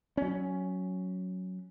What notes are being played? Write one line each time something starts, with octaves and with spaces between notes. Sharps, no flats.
F#3 C#4